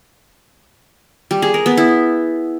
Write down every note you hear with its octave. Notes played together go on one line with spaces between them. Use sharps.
G3
G#4
A#4
B3
E4